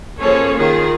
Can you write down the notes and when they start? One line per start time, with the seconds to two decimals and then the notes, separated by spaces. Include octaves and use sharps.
0.20 F3 A#3 C#4 G#4 A4 C#5
0.58 D#3 F4 G#4